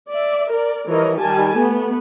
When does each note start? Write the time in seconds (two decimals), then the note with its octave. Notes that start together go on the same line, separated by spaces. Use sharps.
0.11 D5 E5
0.51 A#4 D5
0.88 E3 F3 G3 A#4 C#5 D#5
1.19 D#3 G3 G4 G#5 A5
1.56 A3 B3